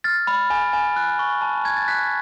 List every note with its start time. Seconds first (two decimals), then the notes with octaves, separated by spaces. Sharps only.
0.04 F6 A6
0.27 B5
0.50 G#5
0.73 G#5
0.96 F#6
1.19 C#6
1.41 A5
1.65 A5 G#6
1.77 A6
1.88 F#6 B6